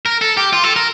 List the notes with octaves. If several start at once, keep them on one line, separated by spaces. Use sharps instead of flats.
A#4
A4
G4
F4
A4
A#4